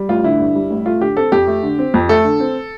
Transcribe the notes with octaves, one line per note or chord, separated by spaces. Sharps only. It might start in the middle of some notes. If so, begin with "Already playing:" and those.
Already playing: G3
A1 F4
D3 E4
G2
G3
A1
A3 F4
D3 G4
C4 A4
F2 G4
A3
D3
C4
F2
A3 A4
D3
C4